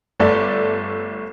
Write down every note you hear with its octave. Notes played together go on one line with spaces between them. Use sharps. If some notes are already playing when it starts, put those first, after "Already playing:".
G1 A3 A4 D5